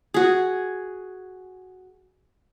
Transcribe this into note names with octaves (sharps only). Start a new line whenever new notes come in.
F#4 G#4